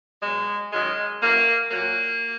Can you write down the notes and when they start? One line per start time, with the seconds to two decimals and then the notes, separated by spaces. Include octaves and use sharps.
0.22 B2 F#3 G#3
0.71 F#2 D#3 F#3 G#3
1.20 F#2 E3 A#3
1.70 A#2 F#3 A#3